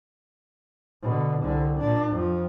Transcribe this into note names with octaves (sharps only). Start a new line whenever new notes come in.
B2 D3
C2 D3
A#2 D4
F2 F3